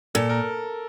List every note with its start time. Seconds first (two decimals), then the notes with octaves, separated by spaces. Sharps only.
0.15 A#2 A4
0.29 A#4